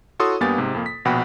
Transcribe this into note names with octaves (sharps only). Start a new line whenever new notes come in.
E4 F#4 A4 C#5 C6 D#6
G2 A#3 B3 G4 G#5 A6
G#2 C3
F2 A#3
B6
A#1 B2 F#5 G5 B5